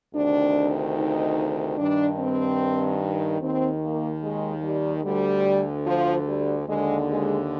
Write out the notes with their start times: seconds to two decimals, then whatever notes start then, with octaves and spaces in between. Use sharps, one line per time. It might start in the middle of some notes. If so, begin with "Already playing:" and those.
0.14 D2 C3 D#3 D4
0.96 D#4
1.78 G2 D#3 D4
2.19 C4
3.40 D#2 D#3 C4
3.82 A#3
4.23 G#3
4.63 G3
5.04 D2 D3 G3
5.85 F3
6.26 G3
6.67 D#2 D3 G#3
7.08 G#3